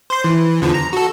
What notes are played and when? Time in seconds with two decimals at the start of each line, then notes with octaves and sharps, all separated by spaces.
0.10 C5 C6
0.24 E3
0.62 E2 D3 F3
0.74 A#5
0.93 F#4 A4